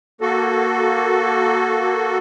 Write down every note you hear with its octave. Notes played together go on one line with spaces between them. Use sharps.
A#3 F#4 A4